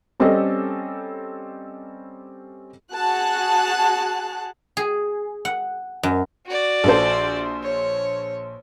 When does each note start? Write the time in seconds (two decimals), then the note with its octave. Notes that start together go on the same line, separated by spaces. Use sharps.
0.20 G3 C4 C#4 G4 A4 D#5
2.92 F#4 G#4 A5 F#6
4.77 G#4
5.45 F#5
6.03 F#2
6.46 F#4 D5
6.84 A#1 A4 C5
7.63 C#5